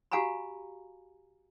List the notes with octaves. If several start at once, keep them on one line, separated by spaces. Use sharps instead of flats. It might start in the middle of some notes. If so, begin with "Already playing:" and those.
F#4 G4 F5 G#5 A#5 B5